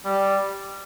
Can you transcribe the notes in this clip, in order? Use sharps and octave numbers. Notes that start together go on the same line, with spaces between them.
G3